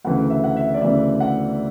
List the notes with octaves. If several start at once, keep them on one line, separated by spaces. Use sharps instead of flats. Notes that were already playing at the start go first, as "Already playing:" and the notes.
D2 C#3 E3 F#5
E5
F#5
E5
D5
D2 C#3 E3 E5
F#5